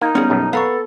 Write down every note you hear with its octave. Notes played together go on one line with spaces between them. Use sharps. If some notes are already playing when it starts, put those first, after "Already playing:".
A#3 D#4
G3 B3 C#4 G#4
B1 F#2
B3 A4 F5 A#5 C#6